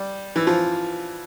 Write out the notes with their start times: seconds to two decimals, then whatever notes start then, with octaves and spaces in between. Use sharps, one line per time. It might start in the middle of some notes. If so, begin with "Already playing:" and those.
Already playing: G3
0.36 E3
0.47 F3